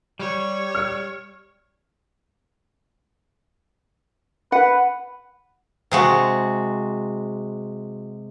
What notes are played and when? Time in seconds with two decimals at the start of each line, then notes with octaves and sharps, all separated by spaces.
0.19 G3 C#5
0.75 F6 C#7
4.52 B4 F#5
5.91 C3 G#3 F#4